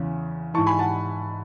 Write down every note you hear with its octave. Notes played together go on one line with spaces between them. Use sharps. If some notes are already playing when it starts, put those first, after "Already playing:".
Already playing: E2 C#3
G#2 E3 A5 C#6
G#5 B5
F#5 A5